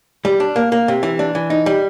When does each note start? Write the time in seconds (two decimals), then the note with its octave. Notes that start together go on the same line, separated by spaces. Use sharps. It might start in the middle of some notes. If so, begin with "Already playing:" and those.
0.25 G3
0.40 D4
0.56 A#3
0.72 A#3
0.88 C3
1.03 E3
1.19 D4
1.35 E3
1.50 D#4
1.66 G3